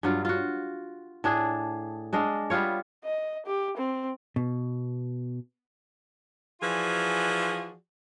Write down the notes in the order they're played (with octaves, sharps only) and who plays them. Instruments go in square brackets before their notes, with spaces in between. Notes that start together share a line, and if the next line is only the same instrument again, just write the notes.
[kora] G2 F#3 F4
F4 F#4
A2 D4 G#4
G#3 D4 D#5 F5
G3 B3 F4 C#5
[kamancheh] D#5
G4
C4
[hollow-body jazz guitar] B2
[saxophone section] E3 F3 F4 F#4 G#4 D5